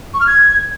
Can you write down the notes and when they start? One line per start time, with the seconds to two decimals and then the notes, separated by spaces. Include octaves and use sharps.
0.13 C#6
0.20 F6
0.26 G#6